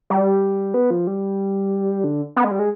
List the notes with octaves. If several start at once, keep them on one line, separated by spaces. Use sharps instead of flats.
G3
B3
F3
G3
D3
B3
G#3
G3
G#3